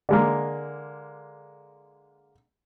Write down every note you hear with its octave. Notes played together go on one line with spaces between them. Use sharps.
D3 G#3 A#3